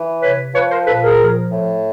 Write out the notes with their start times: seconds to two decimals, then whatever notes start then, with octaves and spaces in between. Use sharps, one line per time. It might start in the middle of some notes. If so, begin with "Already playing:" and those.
Already playing: E3
0.21 C3 B4 C#5
0.53 F3 B4 C#5
0.69 A#4 C5
0.86 A#2 A4 B4
1.02 G#4 A#4
1.18 F3
1.51 A2